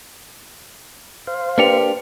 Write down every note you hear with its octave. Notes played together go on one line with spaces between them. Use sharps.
C5 F5
A#3 D4 G4 B4 C#7 F7